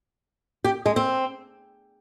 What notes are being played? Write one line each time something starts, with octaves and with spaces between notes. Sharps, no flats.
G4
G#3
C4